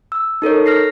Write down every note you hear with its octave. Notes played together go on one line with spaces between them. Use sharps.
E6
D#4 A4 A#4 C#5
F6 A#6 C7